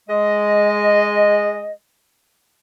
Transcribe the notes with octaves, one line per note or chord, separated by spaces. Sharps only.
G#3 D#5